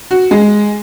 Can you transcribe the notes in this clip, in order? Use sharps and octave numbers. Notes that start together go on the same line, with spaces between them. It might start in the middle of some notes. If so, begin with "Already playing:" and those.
F#4
G#3